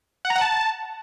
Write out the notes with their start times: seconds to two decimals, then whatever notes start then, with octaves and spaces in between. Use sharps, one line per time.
0.25 F#5
0.30 A#5
0.36 F#5
0.41 A5